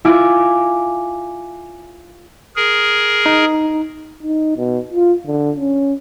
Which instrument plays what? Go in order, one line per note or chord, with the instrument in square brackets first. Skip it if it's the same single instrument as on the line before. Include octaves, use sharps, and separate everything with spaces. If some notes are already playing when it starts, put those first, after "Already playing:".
[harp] E4 F4 G#5 D6 D7
[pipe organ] G#4 A#4
[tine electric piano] D#4
[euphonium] D#4
B2
F4
D3
C#4